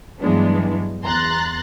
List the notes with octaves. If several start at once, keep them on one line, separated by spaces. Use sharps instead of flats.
G2 E3 F#3 G#3 B3 D4
E2 A#5 C6 F#6 A6